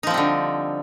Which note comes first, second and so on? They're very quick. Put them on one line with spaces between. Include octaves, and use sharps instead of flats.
D#4 F3 C4 G3 D3